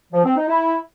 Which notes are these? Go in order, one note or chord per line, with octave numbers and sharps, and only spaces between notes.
F3
C4
D#4
E4